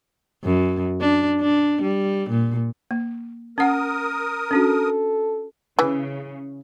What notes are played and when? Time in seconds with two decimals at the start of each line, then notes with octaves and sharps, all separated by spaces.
0.44 F#2
1.00 D4
1.41 D4
1.82 G3
2.30 A#2
2.91 A#3
3.58 C#4 A#4 F#5 D#6
4.51 C#4 D4 F#4 A4
5.79 C#3 E3